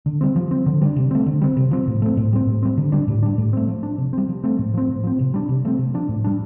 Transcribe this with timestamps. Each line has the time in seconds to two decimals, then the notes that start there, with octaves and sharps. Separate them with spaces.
0.06 D3
0.21 G3 C4
0.36 F3
0.51 C4
0.66 D3
0.82 G3 D4
0.96 C3
1.11 A3 C4
1.26 D3
1.41 G3 C4
1.57 C3
1.71 F3 C4
1.87 A2
2.02 A3 C4
2.17 A2
2.33 G3 C4
2.47 A2
2.63 G3 C4
2.78 D3
2.92 G3 D4
3.08 A2
3.23 G3 D4
3.38 A2
3.53 A3 C4
3.68 F3
3.83 D4
3.98 C3
4.13 G3 C4
4.29 F3
4.44 A3 C4
4.59 A2
4.74 F3 C4
4.89 A2
5.04 F3 C4
5.19 C3
5.34 G3 D4
5.49 C3
5.65 F3 A3 C4
5.79 C3
5.94 F3 D4
6.09 A2
6.24 G3 D4